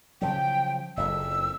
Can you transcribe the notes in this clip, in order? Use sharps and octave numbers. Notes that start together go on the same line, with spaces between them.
C#3 F3 F#3 G5
F#1 F2 E6